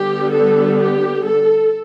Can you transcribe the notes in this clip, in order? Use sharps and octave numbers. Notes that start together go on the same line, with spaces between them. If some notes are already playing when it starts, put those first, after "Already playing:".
Already playing: D3 G3 B3 G4
A4
G4
A4